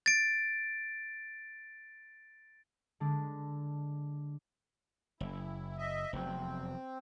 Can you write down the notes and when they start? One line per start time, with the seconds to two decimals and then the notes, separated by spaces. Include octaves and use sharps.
0.06 A6 D7
3.00 D3 G#3 D4
5.20 F#1 E4
5.78 D#5 E5
6.13 F1 E2 F#3 C4